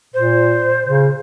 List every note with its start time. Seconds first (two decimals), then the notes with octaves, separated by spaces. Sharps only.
0.14 A#2 C5
0.87 C#3